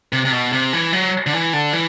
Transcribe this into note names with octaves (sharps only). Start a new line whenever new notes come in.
C3
C3
B2
C3
E3
F#3
D3
E3
D3
E3